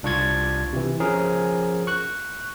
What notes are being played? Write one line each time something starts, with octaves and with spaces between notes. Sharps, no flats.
C2 D4 F4 C#6 G#6 A6
C3 E3
F3 C#4 G#4 A#4
C#6 F#6